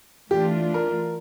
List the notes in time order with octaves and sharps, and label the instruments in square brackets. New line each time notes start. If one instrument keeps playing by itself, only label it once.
[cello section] E3 A3 D4 F4 [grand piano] G4
[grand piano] A#4